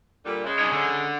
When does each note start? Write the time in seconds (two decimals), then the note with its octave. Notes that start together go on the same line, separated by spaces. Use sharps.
0.24 A#2 D3 G3
0.44 C#3 G#3
0.59 D4 D#4 C#5
0.72 D3